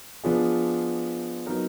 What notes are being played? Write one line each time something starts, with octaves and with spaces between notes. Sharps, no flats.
F3 B3 D4 F4 G#4
F#3 B3 D#4 A#4